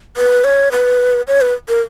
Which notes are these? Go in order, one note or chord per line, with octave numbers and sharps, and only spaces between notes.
B4
C#5
B4
C#5
B4
A#4